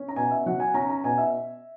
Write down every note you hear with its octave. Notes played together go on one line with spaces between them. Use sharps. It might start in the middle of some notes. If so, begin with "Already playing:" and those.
Already playing: C#4
A#5
B2 G#5
E5
F#3 F#5
G#5
C#4 A#5
A#5
B2 G#5
E5